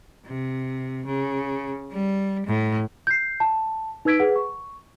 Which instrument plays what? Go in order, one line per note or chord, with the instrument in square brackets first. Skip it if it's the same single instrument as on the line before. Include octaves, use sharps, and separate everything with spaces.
[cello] C3
C#3
G3
A2
[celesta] G6 C7
A5
D#4 B4 E6 G#6 B6 D7
G#4 B4 F#5
C#6